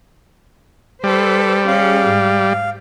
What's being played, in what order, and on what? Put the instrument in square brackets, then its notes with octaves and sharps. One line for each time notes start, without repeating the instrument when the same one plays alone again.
[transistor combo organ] G3 [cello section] A4 B4 C5
[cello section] C#4 G#4 [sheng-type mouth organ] F5
[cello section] G#2